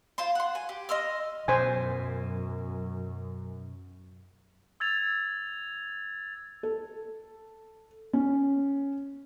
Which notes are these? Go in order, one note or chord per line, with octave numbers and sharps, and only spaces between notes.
F4 C5 C6
F#5 C6
G#5
G4
D#5 C6 E6 F6
F#2 B2 C5 G#5
E6 G#6 A6 F7
A4
C#4